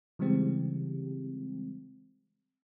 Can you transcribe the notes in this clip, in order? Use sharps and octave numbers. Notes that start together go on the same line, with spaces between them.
C#3 E3 G3 G#3 C4 G4